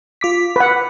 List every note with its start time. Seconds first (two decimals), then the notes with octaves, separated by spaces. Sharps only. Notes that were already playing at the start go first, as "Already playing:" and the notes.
0.21 F4 D6 B6
0.56 B4 F#5